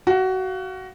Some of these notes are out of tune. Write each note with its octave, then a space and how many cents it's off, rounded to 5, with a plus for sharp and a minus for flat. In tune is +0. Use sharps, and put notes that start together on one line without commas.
F#4 +20 F5 +0